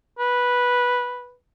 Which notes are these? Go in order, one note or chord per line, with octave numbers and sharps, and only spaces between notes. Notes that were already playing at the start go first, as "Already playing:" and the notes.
B4